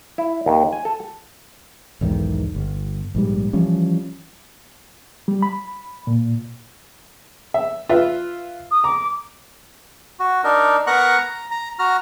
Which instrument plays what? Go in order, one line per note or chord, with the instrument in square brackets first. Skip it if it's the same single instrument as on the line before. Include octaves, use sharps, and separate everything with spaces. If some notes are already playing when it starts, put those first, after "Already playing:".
[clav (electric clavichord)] E4
D#2
G#5
A4
[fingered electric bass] B1 E2 G#2 D#3
G1
A#1 G#2 G3
E3 F3 G3 C#4
[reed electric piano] G3
B5
A#2
[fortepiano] E5
F4 B4 E5
[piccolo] D#6
[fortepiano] A#5 [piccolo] D6
[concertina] F#4
D4 D#4 A#4
B3 A#4 F#5 A#5 C#6 F#6
A#5
A#5
F#4 A#5 F6